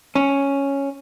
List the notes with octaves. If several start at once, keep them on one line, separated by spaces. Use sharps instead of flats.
C#4